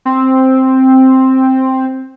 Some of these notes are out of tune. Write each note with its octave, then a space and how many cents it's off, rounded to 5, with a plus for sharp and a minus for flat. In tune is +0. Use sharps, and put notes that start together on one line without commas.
C4 +5